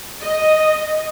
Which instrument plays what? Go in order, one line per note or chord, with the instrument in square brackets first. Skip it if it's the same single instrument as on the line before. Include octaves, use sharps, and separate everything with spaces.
[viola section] D#5